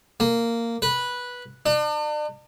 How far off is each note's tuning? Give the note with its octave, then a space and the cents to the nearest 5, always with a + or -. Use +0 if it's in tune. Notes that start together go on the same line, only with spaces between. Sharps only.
A#3 -10
B4 -10
D4 +40